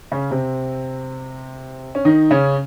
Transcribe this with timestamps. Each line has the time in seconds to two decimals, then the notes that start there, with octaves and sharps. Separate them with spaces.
0.12 C#3 C#4
0.31 C3 C4
1.95 C#4
2.05 D#3 D#4
2.31 C#3 C#4